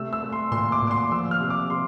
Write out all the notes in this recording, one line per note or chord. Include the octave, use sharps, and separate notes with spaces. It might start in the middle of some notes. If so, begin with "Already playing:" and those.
Already playing: C3 G3 A3 E6
E6
A3
C6
A#2 C6
D6
A#2
D6
C6
F3 E6
F6
C3
D6
C3 C6